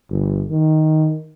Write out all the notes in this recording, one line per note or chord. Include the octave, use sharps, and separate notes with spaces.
G1
D#3